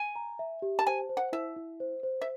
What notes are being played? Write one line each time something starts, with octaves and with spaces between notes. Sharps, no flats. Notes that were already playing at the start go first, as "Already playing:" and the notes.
Already playing: G#5
A#5
E5
G4
A5
C5 G#5
C5
F#5
E4 E5
E4
C5
C5
E5